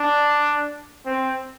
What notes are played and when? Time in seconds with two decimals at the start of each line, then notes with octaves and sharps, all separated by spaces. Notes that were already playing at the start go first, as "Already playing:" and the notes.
Already playing: D4
1.06 C4